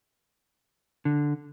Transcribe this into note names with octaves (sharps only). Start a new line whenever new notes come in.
D3